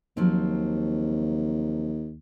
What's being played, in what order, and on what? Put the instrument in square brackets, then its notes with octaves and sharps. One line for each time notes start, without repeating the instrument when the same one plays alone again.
[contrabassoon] D#2 [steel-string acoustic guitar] F3 F#3 C4